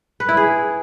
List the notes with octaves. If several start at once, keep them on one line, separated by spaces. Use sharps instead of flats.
B4
E4
G#4